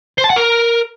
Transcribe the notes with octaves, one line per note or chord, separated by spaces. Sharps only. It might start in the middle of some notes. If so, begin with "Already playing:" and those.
C5
A5
F#5
A#4